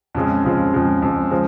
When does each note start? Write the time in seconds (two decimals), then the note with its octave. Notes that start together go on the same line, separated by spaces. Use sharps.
0.15 F2 C#3 F3 G#3
0.44 F2 C#3 F3 G#3
0.73 F2 C#3 F3 G#3
1.02 F2 C#3 F3 G#3
1.31 C#3 F3 G#3 C4